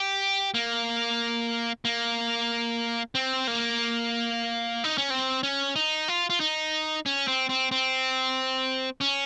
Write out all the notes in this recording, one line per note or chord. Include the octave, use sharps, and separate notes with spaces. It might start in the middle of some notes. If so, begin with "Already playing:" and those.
Already playing: G4
A#3
A#3
C4
A#3
D#4
C#4
C4
C#4
D#4
F4
F4
D#4
C#4
C4
C4
C4
C#4